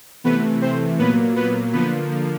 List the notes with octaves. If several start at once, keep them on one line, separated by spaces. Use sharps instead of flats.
C3 E3 A3 B3 B4
C4 C5
A#2 F#3 A#3 B3 B4
B3 B4
D3 F3 A#3 B3 B4